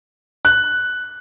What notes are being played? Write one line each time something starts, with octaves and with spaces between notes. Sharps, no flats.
F#6